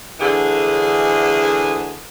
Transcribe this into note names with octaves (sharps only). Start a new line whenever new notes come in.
D2 D3 E3 G#4